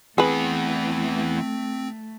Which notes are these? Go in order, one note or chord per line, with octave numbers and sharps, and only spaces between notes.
E3 A3 B3 C4 G#4 B4